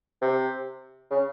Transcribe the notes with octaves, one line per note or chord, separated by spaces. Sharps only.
C3
C#3